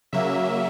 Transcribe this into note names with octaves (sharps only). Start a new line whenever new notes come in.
C#3 F#3 A#3 E5